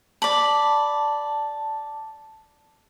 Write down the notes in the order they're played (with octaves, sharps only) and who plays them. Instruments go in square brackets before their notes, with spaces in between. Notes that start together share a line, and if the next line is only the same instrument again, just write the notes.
[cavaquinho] D5 B5 [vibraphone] A5